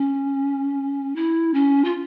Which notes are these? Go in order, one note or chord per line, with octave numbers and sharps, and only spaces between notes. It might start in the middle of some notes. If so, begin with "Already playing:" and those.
Already playing: C#4
E4
C#4
F4